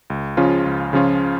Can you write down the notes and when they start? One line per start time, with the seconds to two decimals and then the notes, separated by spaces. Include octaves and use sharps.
0.10 C#2
0.37 C#3 F3 C#4 F4
0.65 C#2
0.93 C#3 F3 C#4 F4